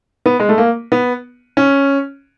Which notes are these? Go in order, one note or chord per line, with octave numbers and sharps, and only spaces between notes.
B3
G#3
A3
A#3
B3
C#4